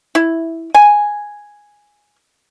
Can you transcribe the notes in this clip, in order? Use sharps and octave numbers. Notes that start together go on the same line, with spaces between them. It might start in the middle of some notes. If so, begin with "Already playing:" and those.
E4
G#5